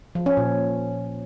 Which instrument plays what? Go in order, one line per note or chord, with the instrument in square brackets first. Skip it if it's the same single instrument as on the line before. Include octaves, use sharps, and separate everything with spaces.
[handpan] F3
C#4
A#2